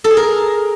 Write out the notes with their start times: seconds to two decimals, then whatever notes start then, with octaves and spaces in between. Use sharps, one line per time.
0.04 A4
0.11 G#4
0.17 A#4